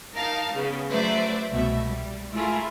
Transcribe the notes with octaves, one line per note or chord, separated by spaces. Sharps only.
D#4 A#4 F5 A5
C#3 B3
F#3 A3 B4 C5 D5 E5
C2 B2 A3 E5
G3
A3 E4 F4 G#4 A#4